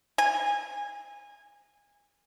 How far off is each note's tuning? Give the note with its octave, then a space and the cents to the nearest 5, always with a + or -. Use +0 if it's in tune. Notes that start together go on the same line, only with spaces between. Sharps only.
G#5 -25